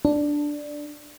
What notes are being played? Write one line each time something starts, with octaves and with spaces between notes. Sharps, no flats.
D4